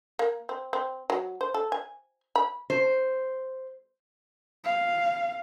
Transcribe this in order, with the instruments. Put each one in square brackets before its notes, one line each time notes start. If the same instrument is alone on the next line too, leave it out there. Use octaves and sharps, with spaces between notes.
[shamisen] A#3
C4
C4
F#3
C5
A4
G#5
B5
[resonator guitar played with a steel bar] C5
[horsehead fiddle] F5